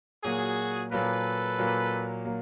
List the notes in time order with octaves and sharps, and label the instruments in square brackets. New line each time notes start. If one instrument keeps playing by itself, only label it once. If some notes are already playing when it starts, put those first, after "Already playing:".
[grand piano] A#2 F#3 A#3 [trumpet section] F#4 G#4
[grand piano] A#2 F#3 A#3 [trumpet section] A4 B4
[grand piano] A#2 F#3 A#3
F#3 A#3